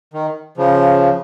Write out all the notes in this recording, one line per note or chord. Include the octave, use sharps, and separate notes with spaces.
D#3
C#3 F3